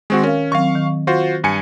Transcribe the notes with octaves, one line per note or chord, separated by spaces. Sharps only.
D#3 G#3 C4 F#4 C#6
C#4 A#4 F5
D#3 F#3 C4 F5 C#6
D#3
F4 F#4 C5
G2 G#5 C#7